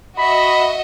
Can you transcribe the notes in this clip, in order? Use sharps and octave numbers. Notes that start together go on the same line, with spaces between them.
F#4 D#5 E5 B5